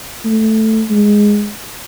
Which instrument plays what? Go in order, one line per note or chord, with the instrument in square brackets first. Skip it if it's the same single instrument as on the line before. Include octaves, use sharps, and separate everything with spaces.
[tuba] A3
G#3